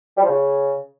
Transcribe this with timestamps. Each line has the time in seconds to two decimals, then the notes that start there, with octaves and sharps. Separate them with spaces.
0.17 G3
0.23 F3
0.29 C#3